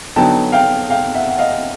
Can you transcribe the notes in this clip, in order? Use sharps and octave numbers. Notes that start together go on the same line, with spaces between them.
D3 F#3 B3 D#4 G5 A5
F5 G5
F5 G5
E5 F#5
F#5
D#5 F5